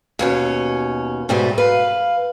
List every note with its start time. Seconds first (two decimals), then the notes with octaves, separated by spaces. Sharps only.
0.19 D#2 B2 C#4
1.29 G#2 B2 G3 A3 C4
1.58 B4 F5